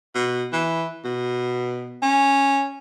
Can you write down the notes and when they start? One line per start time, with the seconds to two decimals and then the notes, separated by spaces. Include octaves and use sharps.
0.15 B2
0.53 E3
1.05 B2
2.03 C#4